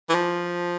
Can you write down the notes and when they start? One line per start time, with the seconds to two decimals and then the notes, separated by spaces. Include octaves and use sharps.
0.09 E3
0.14 F3